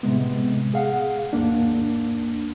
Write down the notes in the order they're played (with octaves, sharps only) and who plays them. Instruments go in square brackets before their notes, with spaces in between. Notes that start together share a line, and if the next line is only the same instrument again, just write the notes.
[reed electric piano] A2 C3 G#3 B3
G#4 F5 F#5
D#2 G#2 A#3 D4